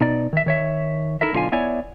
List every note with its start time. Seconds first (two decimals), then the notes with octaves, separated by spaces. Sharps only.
0.01 B2 D#4 D5
0.33 D#3 E5
0.46 D#3 C#5 E5
1.21 D#4 E4 A4 A#4 E5
1.33 B1 D3 F4 F5 G#5
1.52 B3 E4 C#5 D5 G#5